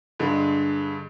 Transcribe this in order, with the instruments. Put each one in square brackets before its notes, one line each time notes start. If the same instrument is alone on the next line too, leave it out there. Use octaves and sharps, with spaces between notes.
[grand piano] G2 D3 G#3